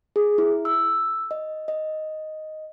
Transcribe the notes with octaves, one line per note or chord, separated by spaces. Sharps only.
G#4
E4
E6
D#5
D#5